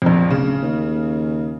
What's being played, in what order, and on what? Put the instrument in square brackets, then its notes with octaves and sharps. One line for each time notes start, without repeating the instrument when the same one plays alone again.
[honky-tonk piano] A#1 F2
[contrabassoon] D1 [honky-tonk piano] C#3
[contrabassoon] D#2